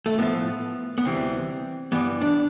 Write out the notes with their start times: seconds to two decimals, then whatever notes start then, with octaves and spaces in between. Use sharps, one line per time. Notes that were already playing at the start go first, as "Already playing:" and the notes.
0.06 A3
0.18 A2 F3 B3
0.98 B3
1.05 D2 C3 E3 G3 C4
1.92 G2 E3 G3 B3
2.21 D4